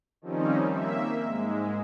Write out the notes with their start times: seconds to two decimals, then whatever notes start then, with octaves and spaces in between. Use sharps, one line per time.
0.21 D#3 F3 G3 C4 C#4 D#4
0.69 A#3 E5
1.25 G#2 G#3